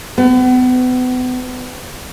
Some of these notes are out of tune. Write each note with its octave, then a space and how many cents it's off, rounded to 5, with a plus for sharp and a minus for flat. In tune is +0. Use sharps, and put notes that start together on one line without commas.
B3 +35